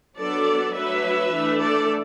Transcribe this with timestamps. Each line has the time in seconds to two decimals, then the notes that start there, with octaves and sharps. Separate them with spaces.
0.18 F#3 B3 D4 A4 D5
0.75 F#3 A3 D4 B4 E5
1.33 E3 A3 D4
1.61 A4 D5